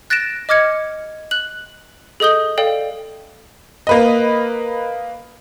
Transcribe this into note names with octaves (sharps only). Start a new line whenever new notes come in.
F#6 A6 A#6 D7 E7
D#5 D6 F6 G#6 C#7
F#6 F#7
G#4 A4 D#5 D#6 G6 G7
A4 D5 F5 G5
A#3 B4 D#5